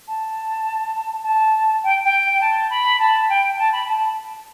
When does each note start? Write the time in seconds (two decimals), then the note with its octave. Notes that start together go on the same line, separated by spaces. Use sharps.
0.07 A5
1.23 A5
1.83 G5
2.05 G5
2.41 A5
2.70 B5
3.00 A5
3.29 G5
3.58 A5
3.72 B5
3.87 A5